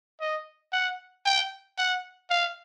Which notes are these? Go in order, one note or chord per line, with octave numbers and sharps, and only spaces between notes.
D#5
F#5
G5
F#5
F5